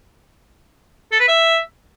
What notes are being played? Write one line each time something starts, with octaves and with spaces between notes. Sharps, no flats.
A4
B4
E5